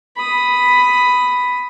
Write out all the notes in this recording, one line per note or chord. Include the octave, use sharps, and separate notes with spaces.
B5 D#6